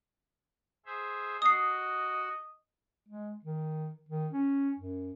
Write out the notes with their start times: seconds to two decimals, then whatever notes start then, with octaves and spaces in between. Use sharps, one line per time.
0.86 G#4 C5 E5
1.42 F#4 D#5 D#6 C7
3.08 G#3
3.44 D#3
4.09 D#3
4.32 C#4
4.79 F#2